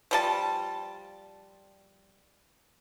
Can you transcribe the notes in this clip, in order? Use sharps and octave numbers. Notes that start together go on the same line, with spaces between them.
F3 G3 A5